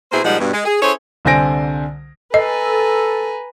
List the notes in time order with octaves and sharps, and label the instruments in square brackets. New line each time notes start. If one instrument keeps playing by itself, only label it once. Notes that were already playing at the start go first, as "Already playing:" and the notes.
[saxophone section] B2 A#3 E4 G#4 C5
A#2 F3 G3 G#3 D#4 F#5
G2 B2
G#3
G#4
C#4 E4 G#4 A4 C5 C#5
[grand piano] C2 D3 C5 G#5 A#6 D7
[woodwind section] A4 [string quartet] B4 G#5 A#5 [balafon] D#5